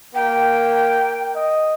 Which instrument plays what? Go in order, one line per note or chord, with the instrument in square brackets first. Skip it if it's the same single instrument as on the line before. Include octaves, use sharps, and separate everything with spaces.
[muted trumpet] A#3 [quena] G5
[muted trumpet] D#5